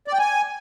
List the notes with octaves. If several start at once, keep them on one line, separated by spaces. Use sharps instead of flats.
D5
G5
G#5